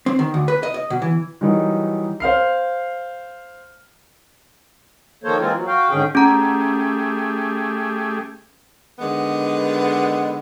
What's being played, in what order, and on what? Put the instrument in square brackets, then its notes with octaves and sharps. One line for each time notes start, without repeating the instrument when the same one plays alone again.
[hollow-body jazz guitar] C4
D#3
D2
B4
D#5
D#5
B2
E3
[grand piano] D#3 E3 F#3 G3 D#4
C5 F5 F6 C7
[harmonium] D#3 F3 A#3 A4 C5 C#5
E3 G#3 A#3 C4 F4
F#3
F#4 F5 G5
G#2 D3 D#3 C#4 G#4 G5
[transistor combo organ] A3 G4 G#4 [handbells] C#4 A#5
[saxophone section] D3 D#3 G#3 B3